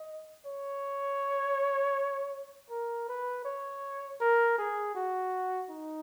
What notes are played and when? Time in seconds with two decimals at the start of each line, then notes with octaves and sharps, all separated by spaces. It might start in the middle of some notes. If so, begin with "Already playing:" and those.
Already playing: D#5
0.46 C#5
2.70 A#4
3.09 B4
3.45 C#5
4.20 A#4
4.58 G#4
4.95 F#4
5.70 D#4